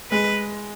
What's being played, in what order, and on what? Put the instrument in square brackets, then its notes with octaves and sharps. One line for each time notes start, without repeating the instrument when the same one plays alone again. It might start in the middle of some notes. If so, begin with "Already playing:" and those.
[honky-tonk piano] G#3 [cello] B4